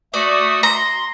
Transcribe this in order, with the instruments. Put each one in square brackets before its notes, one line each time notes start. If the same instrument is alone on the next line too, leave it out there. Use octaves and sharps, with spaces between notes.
[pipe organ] A3 F#4 D#6 [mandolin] D5
[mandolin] A#5 [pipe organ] C6